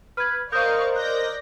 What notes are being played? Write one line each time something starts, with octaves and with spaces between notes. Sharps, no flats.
B4 F6 G#6
A#4 C5 D5 D#5 F5 C#6 D#6 G6
D5 F#6 G6 A#6